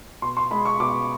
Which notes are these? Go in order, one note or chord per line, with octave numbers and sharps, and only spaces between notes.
B2 C6
C6
G#3 B5
C#6
B2 D6